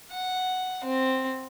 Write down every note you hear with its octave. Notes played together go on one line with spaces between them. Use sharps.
F#5
C4